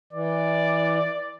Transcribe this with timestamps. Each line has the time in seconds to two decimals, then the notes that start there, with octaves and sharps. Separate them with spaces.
0.13 E3 D5